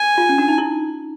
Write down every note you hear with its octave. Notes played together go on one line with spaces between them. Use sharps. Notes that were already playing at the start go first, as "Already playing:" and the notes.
Already playing: G#5
F4
C#4
D4
D#4
E4